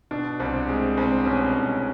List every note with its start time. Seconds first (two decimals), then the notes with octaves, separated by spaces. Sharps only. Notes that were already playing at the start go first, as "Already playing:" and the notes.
0.11 B2 D4
0.40 C2 C4
0.69 G#3 C4
0.97 C2 C4
1.26 B2 C#4
1.43 C4
1.55 C2 C#4